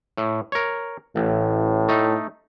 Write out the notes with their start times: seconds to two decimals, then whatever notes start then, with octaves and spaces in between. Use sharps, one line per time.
0.17 A2
0.52 A#4 C#5
1.16 A1 A2
1.88 A3 D#4